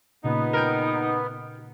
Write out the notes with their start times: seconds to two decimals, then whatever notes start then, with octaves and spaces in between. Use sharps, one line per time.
0.24 A#2 C#3 B3 D#4
0.54 A#4 G5